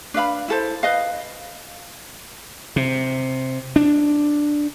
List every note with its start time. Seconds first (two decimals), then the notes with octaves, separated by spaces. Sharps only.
0.14 D4 B4 F5 B5
0.48 E4 A4 C5
0.83 B4 D#5 F5
2.76 C3
3.76 D4